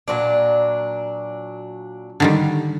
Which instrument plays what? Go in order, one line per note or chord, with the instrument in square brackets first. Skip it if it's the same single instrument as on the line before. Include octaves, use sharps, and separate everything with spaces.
[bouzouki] A#2 F#3 D4
[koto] D3 D#3 G3